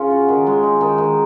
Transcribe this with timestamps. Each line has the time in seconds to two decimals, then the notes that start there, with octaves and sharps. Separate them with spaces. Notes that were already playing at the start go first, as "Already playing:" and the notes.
Already playing: C#3 C#4 F4
0.11 F#4
0.28 D#3
0.47 G#3
0.63 D#4
0.81 D#3
0.98 D#3